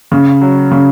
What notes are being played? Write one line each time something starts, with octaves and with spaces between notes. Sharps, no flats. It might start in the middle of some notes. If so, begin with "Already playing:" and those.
C#3
F#3
C#3